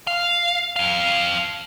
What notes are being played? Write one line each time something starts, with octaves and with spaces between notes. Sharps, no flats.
F5
F2 F5